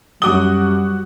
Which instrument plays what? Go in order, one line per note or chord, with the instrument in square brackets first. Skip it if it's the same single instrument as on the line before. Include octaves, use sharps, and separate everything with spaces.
[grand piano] F#2 D6 G7 [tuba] G3 [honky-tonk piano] F#4 D#6